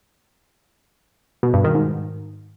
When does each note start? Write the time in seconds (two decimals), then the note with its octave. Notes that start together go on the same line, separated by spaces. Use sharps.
1.43 B2
1.54 G2
1.64 D#3
1.75 G#2